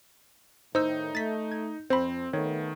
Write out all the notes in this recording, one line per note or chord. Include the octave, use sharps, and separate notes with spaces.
A2 D#3 D#4 C5 E6
A3 A6 B6
G#6
F2 C4 C5 B5
D#3 A3 B3 A4 C#5